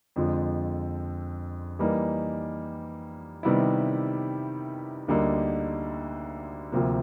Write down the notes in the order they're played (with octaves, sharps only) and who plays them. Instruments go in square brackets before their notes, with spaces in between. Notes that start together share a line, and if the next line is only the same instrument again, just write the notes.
[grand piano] F2 D3 F3 G#3
E3 G3 A#3 D#4
C3 D#3 G3 B3 E4
D2 D3 G3 A#3 D#4
D2 C3 F3 A#3